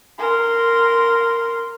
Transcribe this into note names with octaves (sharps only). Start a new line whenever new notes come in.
A#4 C6